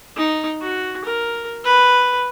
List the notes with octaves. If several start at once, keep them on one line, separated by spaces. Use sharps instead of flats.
D#4
F#4
A#4
B4